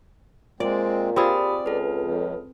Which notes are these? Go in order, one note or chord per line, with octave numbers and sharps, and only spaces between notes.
A#2 G#3 C4 D5
C4 F4 G4 G#4 D5 B5 D#6
C#2 A4 B4
F2 C#3